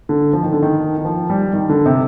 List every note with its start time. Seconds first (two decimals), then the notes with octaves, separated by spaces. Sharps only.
0.09 D3
0.33 F3
0.43 D#3
0.52 D3
0.62 D#3
0.97 D#3
1.05 F3
1.30 G3
1.53 D#3
1.69 D3
1.86 C3